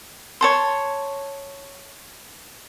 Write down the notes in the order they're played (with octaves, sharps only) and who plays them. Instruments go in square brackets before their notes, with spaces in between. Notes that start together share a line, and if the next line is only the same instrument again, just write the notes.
[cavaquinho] C#5 A5 C6